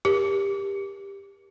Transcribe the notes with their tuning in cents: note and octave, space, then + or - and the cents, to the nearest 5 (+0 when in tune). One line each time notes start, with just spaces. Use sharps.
G4 +20 A#4 +25